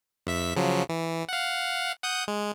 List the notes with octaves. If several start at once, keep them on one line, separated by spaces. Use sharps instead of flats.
F2 E5 B6
C#3 F3 F#3
E3
F5 F#5
F#5 D#6 G6
G#3